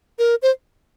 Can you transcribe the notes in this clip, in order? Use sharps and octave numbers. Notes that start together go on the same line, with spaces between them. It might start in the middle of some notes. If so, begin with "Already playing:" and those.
A#4
C5